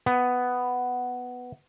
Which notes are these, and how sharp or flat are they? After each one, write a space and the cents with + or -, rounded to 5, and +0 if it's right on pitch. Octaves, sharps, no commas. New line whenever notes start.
B3 +5